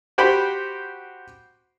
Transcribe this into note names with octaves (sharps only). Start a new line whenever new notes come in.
F#4 G4 C5 G5 B5